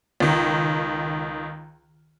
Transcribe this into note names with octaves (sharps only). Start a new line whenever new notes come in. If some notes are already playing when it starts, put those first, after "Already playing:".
C#2 D#3